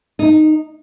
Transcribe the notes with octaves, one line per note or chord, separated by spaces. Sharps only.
D#4